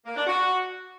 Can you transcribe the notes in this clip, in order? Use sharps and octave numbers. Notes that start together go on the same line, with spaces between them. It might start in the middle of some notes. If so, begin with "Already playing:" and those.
A#3
D4
F#4